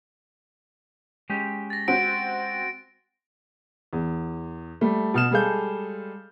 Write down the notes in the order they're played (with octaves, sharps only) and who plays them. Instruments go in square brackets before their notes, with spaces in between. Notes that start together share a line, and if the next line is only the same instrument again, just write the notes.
[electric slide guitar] G#3 C#4 G4
[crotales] A6 A#6
[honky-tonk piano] C4 F#4 [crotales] D7
[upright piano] E2
G3 A3
B2 F6 E7
G3 G#3 G#4 A4 F5 G6